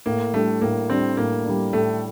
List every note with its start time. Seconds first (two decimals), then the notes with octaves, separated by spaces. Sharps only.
0.06 A2 A#3
0.34 G3 A3 D4
0.61 A2 A#3
0.90 G3 C4 D4
1.17 A2 A#3
1.45 G3 D4
1.73 A2 A3